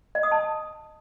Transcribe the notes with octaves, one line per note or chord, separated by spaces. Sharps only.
D#5
D#6
A5